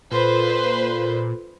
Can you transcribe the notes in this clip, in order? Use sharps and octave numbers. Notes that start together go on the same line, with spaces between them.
A#2 F4 A4 B4 C5